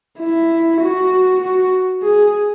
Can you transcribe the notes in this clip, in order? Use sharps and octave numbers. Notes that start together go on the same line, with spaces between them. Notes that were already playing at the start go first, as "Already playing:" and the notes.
E4
F#4
F#4
G#4